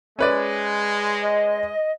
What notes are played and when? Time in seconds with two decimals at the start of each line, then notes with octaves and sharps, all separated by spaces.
0.19 G#3 C#4 B4 D5
1.22 D#5